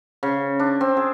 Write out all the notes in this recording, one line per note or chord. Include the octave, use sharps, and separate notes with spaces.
C#3
D4
C4
G#4